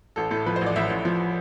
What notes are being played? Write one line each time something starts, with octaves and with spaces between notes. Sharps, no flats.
A1 A4
A2 A4
F3 B4
C5
A1
D5
A1 E5
A1
F3